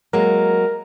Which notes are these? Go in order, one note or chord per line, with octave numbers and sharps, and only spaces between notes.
F#3 G#3 A#3 A#4